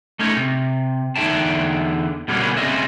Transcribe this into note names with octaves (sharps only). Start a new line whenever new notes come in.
A3 C#4 D#4 C#5
C3
E2 D3 D#4 E5 G5 A5
B2 D3 G3 A#3 B3 C#4
C#3 E3 G3 C4 D#5 E5